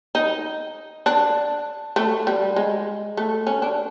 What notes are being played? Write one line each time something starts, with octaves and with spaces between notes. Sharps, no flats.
D#4
D4
A3
G3
G#3
A3
C#4
D4